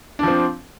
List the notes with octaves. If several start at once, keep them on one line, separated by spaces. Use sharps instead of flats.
F3 C4 D4